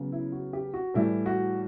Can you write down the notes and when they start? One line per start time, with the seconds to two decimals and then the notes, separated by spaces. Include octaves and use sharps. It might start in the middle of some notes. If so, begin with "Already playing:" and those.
Already playing: C#3 F#3 B3
0.12 E4
0.32 F#4
0.53 G4
0.74 F#4
0.94 A2 E3 G3 E4
1.26 F#4